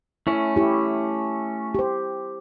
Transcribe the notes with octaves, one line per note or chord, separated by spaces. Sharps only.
A3 C#4 E4
E4 G4
G4 C5